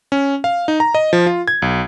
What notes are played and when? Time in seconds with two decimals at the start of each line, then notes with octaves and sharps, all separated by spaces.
0.12 C#4
0.44 F5
0.68 D#4
0.80 A#5
0.95 D#5
1.13 F3
1.26 F4
1.48 G#6
1.62 B1